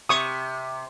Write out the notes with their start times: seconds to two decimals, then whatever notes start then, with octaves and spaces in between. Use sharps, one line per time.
0.09 C3 C#6 D#6